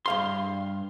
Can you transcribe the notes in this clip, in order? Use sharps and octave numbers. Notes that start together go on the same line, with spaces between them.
G2 F5 C6